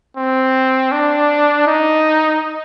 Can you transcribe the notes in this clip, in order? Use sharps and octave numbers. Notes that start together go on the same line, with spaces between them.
C4
D4
D#4